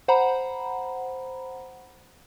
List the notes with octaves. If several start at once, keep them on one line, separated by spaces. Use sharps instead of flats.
C5 F#5 A#5 B5